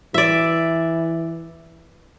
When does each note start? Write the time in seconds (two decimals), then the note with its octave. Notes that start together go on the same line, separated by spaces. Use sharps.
0.14 E3 D5 E5